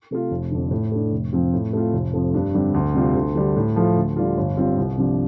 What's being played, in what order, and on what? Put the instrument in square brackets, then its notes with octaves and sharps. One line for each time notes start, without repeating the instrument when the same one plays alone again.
[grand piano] C3 A3 F4
F1
F2 D3
A2
A3 D4
F1
F2 F3 C4 F4
A2
A3 C4 F4
F1
F2 F3 A3
G2
D3 G3 C4
D2
C3 G3 C4 F4
D2
D3 G3
A2
F3 A3 F4
D2
D3 G3 D4 F4
G1
G2 G3 C4 F4
C2
C3 F3 D4